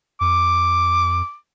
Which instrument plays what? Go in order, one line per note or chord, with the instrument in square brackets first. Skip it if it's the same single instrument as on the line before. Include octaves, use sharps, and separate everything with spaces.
[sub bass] F2 [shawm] D6